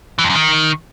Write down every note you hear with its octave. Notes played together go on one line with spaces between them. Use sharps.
E3
F2
F#2
D#3